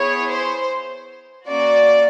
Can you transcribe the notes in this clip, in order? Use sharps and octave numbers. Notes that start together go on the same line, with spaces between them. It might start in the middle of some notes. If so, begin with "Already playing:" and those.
Already playing: B3 E4 G#4 C#5
C5
A#3 C#4 F#4 D5